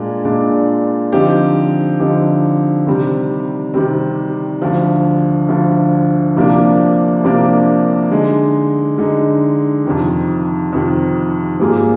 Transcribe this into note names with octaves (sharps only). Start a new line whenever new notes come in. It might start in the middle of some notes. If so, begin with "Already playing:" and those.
Already playing: A#2 G#3 D4
A#2 G#3 D4
D3 F3 C4 D#4 G4
D3 F3 C4 D#4 G4
C3 D#3 G3 C4
C3 D#3 G3 C4
D2 D3 F3
D2 D3 F3
C2 C3 F3 A#3 D4
C2 C3 F3 A#3 D4
D3 G#3 D#4
D3 G#3 D#4
F2 C3 D#3
F2 C3 D#3
G#2 G3 A#3 F4 G#4